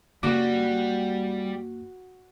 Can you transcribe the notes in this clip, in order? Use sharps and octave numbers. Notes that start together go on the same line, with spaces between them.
F#2 C#3 G3 A#3 F#4 F#5 C#6 D6